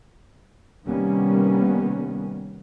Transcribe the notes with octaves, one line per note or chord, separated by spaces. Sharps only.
C3 D#3 G3 A#3 B3 C#4